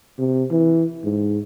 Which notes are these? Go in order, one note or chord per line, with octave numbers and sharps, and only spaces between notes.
C3
E3
G#2